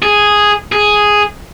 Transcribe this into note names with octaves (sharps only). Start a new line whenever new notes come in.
G#4
G#4